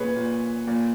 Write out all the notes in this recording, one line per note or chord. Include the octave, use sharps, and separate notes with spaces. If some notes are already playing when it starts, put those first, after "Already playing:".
Already playing: A#2 G#4 B4 C#5
A#2
A#2